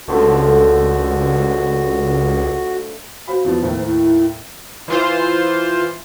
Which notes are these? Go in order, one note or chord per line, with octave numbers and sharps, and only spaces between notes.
C#2 D3 F3 A3 F#4
F#4 C5 F5 B5
E2 F3
D#2 A2 C5
E4
E3 F4 C5